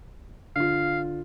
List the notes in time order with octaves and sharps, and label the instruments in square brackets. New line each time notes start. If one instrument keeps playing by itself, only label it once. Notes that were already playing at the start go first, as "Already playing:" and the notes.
[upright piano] D3 F4 [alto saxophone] F5